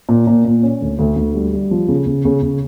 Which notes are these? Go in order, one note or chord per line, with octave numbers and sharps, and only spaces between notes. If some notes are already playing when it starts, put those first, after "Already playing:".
A#2
A#2
A#2
C#4
D2
D2
D2
G3
G3
F3
C#3
C#3
C#3
C#3